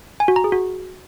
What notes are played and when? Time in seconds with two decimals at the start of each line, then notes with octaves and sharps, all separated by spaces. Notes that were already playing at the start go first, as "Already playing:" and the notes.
0.20 G#5
0.28 F#4
0.36 A#5
0.44 G#4
0.52 F#4